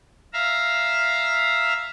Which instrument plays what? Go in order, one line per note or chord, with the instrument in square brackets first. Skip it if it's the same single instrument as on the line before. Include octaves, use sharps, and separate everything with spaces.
[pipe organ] E5 F5 A#5